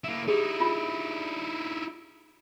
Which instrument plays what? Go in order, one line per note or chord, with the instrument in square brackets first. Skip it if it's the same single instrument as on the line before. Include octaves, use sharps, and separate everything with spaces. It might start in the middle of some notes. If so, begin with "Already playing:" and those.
[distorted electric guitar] A#3 E4
[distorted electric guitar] D#4 E4 [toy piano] G4 G#4
[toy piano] F4 B5